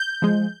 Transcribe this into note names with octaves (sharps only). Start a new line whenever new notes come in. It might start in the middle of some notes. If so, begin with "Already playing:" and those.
Already playing: G6
F3 G#3